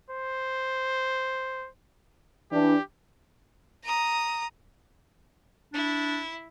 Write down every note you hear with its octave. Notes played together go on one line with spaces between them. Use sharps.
C5
E3 D4 G4
A#5 D#6
D4 E4